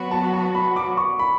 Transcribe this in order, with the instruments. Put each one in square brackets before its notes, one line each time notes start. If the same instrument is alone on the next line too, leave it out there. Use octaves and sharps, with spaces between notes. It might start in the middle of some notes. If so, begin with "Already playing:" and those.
Already playing: [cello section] F#3 B3 F#4 [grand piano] B5
[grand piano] A5
A5
B5
D6
C#6
B5